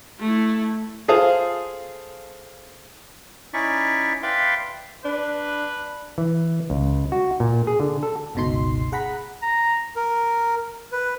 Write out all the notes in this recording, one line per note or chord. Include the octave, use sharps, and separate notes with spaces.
A3 E4
F4 G#4 A4 C5 F5
C#4 D#4 E4 D5 E5 C#6
B4 D5 E5 F5 G5 C6
D4 B4
E3
C#2
F#4
A#2
G#4
D3
A4
G1 C#2 B2 D#4 C6 C7
G#4 F#5 A#5 B5 B6
A#5
A#4
B4